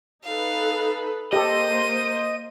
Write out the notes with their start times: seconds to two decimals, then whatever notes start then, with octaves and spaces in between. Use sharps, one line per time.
0.24 D#4 A4 B4 F5
1.33 A#3 G4 A4 C5 D#5 D#7